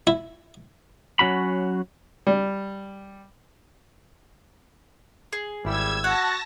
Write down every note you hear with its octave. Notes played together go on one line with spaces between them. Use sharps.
E4
F#3 C#4 F#4 B5
G3
G#4
G#1 G3 E4 E6 G#6
F#4 F#5 A5 A#6